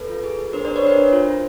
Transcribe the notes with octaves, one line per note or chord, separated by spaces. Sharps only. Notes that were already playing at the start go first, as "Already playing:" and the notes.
Already playing: A4 B4
F4
G#4
G#4
D4 A#4 C5
D4 C5 D5
B4 C#5
D4 A#4 C5
D4
F4
F4